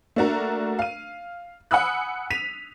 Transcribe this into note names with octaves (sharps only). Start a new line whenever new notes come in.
A3 A#3 D4 F#4 A#4
F5 D#7
F#5 G#5 B5 D#6 E6 F#6
B6 D#7 F7